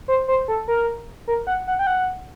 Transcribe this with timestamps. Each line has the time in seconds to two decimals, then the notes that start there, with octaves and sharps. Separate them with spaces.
0.08 C5
0.28 C5
0.48 A4
0.68 A#4
1.28 A#4
1.47 F#5
1.67 F#5
1.79 G5
1.87 F#5